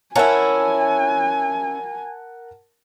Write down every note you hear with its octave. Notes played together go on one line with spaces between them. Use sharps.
C#4 E4 A#4 F#5 G#5 A5